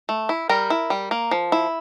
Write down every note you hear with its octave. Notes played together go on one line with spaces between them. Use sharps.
A3
E4
G3 A#4
E4
G3
A#3
F3
E4